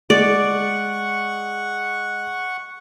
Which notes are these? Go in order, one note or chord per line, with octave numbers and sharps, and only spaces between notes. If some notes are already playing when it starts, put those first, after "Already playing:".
G#3 D5 F#5 C#6